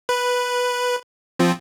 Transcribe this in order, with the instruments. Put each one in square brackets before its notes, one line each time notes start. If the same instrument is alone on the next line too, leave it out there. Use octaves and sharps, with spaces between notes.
[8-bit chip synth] B4 B5
F3 C4 F4